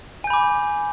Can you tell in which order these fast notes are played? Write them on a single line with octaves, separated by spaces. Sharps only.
G#5 G6 B5 D6